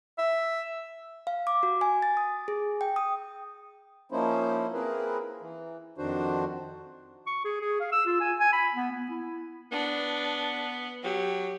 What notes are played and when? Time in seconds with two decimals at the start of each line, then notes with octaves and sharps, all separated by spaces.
0.18 E5
1.27 F5
1.47 D6
1.63 F#4
1.81 G#5
2.02 A6
2.17 D#6
2.48 G#4
2.81 G5
2.96 D#6
4.12 F3 A#3 C#4 D#4 E4 C5
4.73 A#3 C4 E4 G#4 A#4 B4
5.41 E3
5.98 F2 D#3 D4 F#4 C5
7.27 C#6
7.45 G#4
7.61 G#4
7.80 F5
7.92 E6
8.06 F4
8.21 G#5
8.40 G#5
8.53 B5
8.74 B3
8.92 B3
9.10 E4
9.72 B3 D4
11.04 F#3 G4